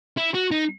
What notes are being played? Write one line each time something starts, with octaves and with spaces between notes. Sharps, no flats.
E4
F#4
D#4